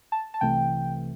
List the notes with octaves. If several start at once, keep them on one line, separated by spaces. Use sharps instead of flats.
A5
A5
C2 C3 E3 A3 G5